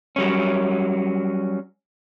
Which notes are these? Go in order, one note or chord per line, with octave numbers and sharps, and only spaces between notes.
F#3 G3 C#4